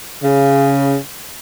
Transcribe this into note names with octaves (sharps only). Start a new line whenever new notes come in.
C#3